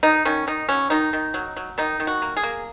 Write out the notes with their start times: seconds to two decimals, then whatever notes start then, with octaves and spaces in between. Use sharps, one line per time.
0.03 D#3 D#4
0.25 D#3 C#4
0.47 D#3 D#4
0.69 F#3 C#4
0.90 D#3 D#4
1.13 D#3
1.34 F#3
1.57 F#3
1.78 D#3 D#4
2.00 D#3
2.07 F#4
2.22 A#3
2.37 G#4
2.43 A#3